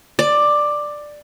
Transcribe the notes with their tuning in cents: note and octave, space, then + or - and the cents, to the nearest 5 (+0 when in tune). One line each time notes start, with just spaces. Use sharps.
D5 +10